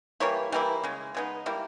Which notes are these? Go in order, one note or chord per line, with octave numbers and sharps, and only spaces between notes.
E3 G3 A#3 E4 C#5
E3 G3 A#3 E4
C#3 G#3
C#3 G#3 B3 D#4
G3 A#3 E4 A#4